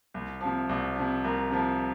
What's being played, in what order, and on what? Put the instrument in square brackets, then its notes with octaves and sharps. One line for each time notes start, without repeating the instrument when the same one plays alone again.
[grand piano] C2
C3 F3
C2
C3 F3
C2 A#4
C3 F3